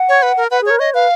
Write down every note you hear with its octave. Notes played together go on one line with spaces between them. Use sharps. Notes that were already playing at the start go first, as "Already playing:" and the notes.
Already playing: F#5
C#5
B4
A#4
B4 F#5
G#4
A#4 C#5
C#5 D#5
B4 F5